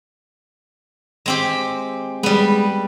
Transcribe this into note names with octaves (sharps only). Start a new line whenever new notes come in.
G#3 C4 G4
G3 G#3 B3